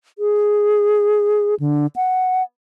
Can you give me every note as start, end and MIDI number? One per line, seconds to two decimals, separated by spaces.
0.19 1.55 68
1.60 1.87 50
1.96 2.42 78